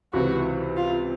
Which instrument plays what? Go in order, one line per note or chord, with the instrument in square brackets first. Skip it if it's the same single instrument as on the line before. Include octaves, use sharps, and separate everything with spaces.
[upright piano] C#2 C3 E3 [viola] F#4
[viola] F4